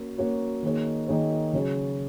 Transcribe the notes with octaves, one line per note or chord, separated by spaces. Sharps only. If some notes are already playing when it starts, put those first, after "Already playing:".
Already playing: A#3 C#4 F#4 A#4 C#5
A#3 C#4 F#4 A#4 C#5
D#3 A#3 D#4 G#4 C#5
D#3 A#3 D#4 G#4 C#5
C#3 F#3 C#4 G#4 C#5